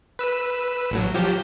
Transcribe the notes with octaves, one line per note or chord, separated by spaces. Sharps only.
B4 E6
A1 A2 F#3
F3 F#3 G4